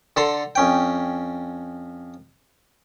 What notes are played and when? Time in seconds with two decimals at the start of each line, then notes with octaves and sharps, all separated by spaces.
0.17 D3 A4 A5 A#5 C6
0.55 F2 C#4 G5